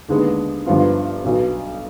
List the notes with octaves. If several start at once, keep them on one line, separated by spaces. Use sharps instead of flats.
D#2 D3 G#3 B3
G1 G2 F3 B3 F4
B1 B2 B3